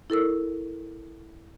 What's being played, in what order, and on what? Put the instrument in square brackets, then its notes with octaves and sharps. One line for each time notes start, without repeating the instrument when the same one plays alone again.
[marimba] E4 A4 A#4 E6